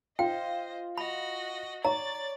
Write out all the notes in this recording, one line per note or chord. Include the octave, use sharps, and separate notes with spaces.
F4 C5 D#5 G5
F#4 D#5 B5
C#5 D5 A#5 A6